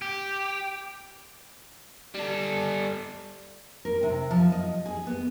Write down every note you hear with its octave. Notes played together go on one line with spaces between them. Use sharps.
G4
G3 A4
A#4
C3
F3
D#5
G#4
B3